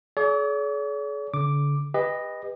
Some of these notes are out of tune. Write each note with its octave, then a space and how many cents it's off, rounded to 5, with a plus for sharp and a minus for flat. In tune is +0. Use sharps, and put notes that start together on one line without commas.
G#4 +45 C#5 +45 D6 +0
D3 -40 D6 +0
G4 +35 B4 +0 D#5 +0